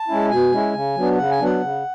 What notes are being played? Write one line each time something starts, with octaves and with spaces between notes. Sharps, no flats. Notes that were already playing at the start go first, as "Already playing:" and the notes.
Already playing: A5
G#3 C#4 E4
B2 G#5
G#3 C#4 E4
C#3
F#3 B3 D4
C#3 F#5
G#5
F#3 B3 D4 F#5
C#3